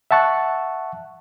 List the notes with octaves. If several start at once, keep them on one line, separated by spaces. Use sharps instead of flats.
E5 F#5 A5 C#6 F#6